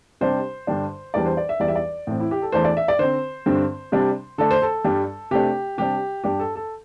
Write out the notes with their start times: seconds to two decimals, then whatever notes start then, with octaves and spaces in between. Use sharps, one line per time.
0.21 C3 G3 D4 C5
0.67 G2 D3 G3 D4
1.14 E2 E3 G3 D4 D5
1.26 C5
1.37 D5
1.49 E5
1.60 E2 E3 G3 D5
1.68 E5
1.75 D5
2.07 A2 E3 C4
2.20 E4
2.31 G4
2.42 A4
2.52 E2 E3 A3 D4 C5
2.64 D5
2.77 E5
2.88 D5
2.99 D3 C4 C5
3.46 G2 D3 C4
3.92 C3 G3 D4
4.38 D3 A3 D4 A4
4.51 C5
4.62 A4
4.84 G2 G3 D4
5.31 C3 A3 D4 G4
5.78 C3 G3 D4 G4
6.24 G2 G3 D4 G4
6.39 A4
6.55 A4